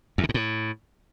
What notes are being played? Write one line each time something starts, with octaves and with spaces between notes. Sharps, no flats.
E2
C#3
G#2
A2